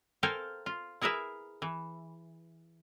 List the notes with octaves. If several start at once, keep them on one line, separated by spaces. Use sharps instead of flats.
A4 A#4 C5 F5 G5 G#5
F4
E4 G#4 A#4 B4 E5
E3